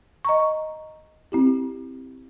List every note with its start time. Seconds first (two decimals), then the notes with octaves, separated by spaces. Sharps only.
0.25 D#5 A#5 C#6
1.32 C4 E4 G4